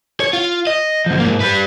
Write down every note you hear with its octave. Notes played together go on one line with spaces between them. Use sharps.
C#5
F4
D#5
D2 F3
G#2 A#3
G3 B4